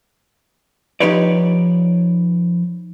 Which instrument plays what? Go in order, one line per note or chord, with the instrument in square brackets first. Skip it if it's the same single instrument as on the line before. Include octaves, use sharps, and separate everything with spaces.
[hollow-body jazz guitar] F3 D#4 G4 B4 C#5 D5